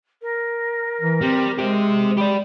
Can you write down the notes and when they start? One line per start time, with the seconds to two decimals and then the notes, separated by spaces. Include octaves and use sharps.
0.22 A#4
1.02 E3
1.22 G3 C4
1.59 G#3 G4 C5
2.17 G4 D5 B5